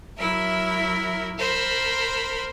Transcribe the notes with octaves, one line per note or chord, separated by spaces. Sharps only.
F#3 E4 A#4 E5
A#4 C5 B5